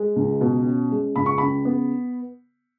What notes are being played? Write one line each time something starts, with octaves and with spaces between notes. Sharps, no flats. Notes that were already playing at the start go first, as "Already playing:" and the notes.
Already playing: G#3
C#2
B2
C#4
G#3
C#2 B5
C#6
C#3 B5
B3